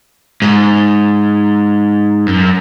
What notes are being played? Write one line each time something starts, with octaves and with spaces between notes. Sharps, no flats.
G#2
F#2